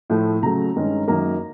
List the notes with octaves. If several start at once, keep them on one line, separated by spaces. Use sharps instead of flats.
A2 F3 A3
C#3 F#3 A3 A#5
G2 D#3 G#3 C#4
F#2 D#3 F#3 A#3 A#5